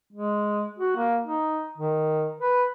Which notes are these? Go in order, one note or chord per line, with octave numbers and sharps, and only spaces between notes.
G#3
F#4
A#3
D#4
D#3
B4